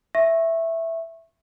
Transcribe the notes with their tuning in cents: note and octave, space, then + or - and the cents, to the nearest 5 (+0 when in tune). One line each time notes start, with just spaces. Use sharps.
E5 +0 C#6 -25